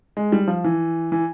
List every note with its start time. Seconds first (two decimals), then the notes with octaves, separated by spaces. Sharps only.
0.17 G#3
0.32 G3
0.48 F3
0.64 E3
1.12 E3